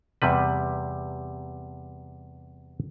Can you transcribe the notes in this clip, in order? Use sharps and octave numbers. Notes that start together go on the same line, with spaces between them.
E2 C3 G3 B4